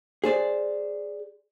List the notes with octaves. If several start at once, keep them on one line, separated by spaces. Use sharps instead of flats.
G#4 C5 D5